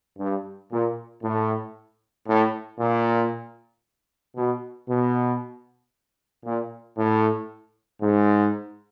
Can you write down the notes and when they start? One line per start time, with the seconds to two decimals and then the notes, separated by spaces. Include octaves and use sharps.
0.19 G2
0.71 A#2
1.23 A2
2.28 A2
2.80 A#2
4.37 B2
4.88 B2
6.45 A#2
6.98 A2
8.02 G#2